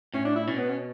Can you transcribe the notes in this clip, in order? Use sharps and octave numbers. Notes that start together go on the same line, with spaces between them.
A2 C#4
D4
E4
B2 C#4
B3
C#4